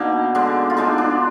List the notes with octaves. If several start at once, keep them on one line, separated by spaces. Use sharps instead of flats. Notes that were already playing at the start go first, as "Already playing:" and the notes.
Already playing: B2 A#3 D4 D#4
D3 G#3 D4
F4
D3 G#3 D4 D#4
D4